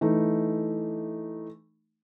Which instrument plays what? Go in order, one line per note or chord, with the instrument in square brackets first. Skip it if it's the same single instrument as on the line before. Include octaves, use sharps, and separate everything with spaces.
[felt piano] E3 A3 D#4